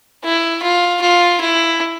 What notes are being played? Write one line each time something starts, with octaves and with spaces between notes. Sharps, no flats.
E4
F4
F4
E4